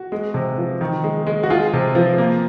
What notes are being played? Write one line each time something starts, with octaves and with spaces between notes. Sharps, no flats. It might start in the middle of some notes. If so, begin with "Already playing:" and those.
Already playing: F#4
G#3
C3
F3
D#3
G#3
G#3
F#4
G#3 F4 G#4
C3
F3
A#3